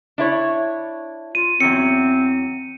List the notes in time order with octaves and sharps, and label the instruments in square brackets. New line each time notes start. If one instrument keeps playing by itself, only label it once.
[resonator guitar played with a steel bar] D4 E4 C#5
[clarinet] F4 [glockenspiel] D#7
[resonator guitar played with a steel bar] E2 F#3 C#4 [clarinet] C4 [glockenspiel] C#7